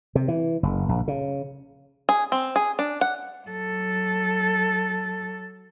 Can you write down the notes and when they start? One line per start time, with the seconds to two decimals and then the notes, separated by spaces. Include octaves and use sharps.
0.15 C3
0.28 E3
0.63 F#1
0.89 A#1
1.08 C#3
2.09 G#4
2.32 C4
2.56 G#4
2.79 D4
3.01 F#5
3.47 F#3 A4